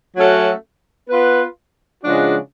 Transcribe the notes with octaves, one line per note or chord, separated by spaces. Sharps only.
F#3 A3 C#4 F#4 A4
B3 F4 B4
C#3 F3 G#3 D4 F#4